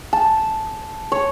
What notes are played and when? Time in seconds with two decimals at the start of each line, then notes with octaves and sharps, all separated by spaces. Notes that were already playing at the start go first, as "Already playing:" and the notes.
0.13 A5
1.12 C#5